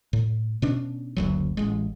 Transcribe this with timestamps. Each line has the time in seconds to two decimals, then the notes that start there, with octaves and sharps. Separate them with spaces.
0.13 A2
0.62 B2 C#4 D4
1.17 F#1 D2 F#3
1.57 A1 G#3